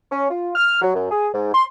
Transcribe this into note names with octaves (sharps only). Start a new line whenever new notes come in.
C#4
F4
F6
F#3
F#2
G#4
G#2
C6